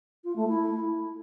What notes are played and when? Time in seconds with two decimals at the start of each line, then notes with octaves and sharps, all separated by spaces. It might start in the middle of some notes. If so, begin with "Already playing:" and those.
0.24 F4
0.36 A3
0.47 E4